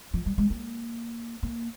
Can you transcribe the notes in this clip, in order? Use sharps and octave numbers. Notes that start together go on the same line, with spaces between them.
F3
G3
G#3
A#3
A#3